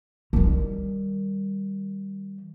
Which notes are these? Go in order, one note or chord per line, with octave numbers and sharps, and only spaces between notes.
D#3 G3